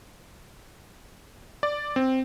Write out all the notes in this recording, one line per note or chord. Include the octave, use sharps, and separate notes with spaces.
D5
C4